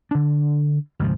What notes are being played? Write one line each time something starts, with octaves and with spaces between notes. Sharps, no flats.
D3 D4
D2 G#2 C3 F3